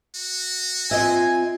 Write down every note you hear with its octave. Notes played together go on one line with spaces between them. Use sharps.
F#4
C4 F4 D#5 E5 G#5